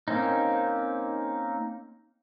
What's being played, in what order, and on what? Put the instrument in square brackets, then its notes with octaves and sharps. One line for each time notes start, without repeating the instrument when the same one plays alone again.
[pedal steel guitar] A#3 C4 C#4 D#4